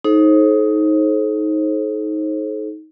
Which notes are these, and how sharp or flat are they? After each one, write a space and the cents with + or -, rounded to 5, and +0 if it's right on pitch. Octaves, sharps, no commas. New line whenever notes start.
D#4 +15 A4 -40 C5 +35